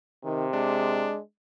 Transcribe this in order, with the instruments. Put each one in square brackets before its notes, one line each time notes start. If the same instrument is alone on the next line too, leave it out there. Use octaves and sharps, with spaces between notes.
[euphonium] C3 [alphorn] D#3
[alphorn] G#3 [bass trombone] D4